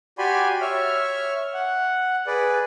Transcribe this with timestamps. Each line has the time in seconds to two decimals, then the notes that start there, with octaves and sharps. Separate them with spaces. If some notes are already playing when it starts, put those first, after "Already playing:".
0.18 F#4 G4 D5 G#5 B5 C6
0.61 C#5 E5 F6
1.54 F#5
2.27 G#4 B4 D5